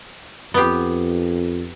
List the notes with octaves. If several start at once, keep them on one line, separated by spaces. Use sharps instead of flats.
F2 B3 G4